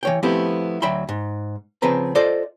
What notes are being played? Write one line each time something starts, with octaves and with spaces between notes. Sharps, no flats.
E3 C#5 G5
F3 A3 B3 C4 E4 G4
D2 F#3 E5 G5 B5 C6
G#2
C#3 F3 C4 G#4 B4 A#5
F4 A4 C5 D5 D#5